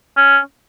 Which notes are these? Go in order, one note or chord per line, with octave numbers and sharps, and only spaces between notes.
C#4